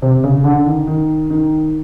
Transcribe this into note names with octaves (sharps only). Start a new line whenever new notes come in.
C3
C#3
D3
D#3
D#3
D#3